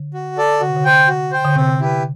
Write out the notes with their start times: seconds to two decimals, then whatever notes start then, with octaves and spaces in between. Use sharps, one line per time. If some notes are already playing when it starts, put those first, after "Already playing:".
Already playing: D3
0.14 F#4
0.38 A4 D5
0.61 D3 F#4
0.69 C3
0.76 D3
0.85 C5 G5
1.08 F#4
1.32 C5 G5
1.45 D3
1.56 C3 C4
1.79 E4 G4 B4